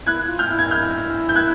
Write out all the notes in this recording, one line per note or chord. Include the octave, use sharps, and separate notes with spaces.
E4 F#6 G#6
F4
F6 G6
E4
G#6
E4 F6 G6
G6
F#6 G#6